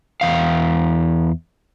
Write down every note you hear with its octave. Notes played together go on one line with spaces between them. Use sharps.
E2 F5